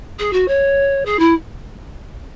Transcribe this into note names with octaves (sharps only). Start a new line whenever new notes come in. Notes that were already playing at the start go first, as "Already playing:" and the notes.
G#4
F#4
C#5
G#4
E4